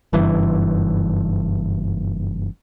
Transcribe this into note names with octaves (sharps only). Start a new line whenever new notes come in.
F#1 G2 E3